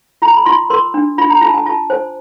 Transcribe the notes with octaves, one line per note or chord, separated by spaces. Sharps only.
F4 A#5
B5
F4 C6
A#4 C6
D4
F4 B5
A#5
F4 A5
G#5
F4 A5
C5 G#5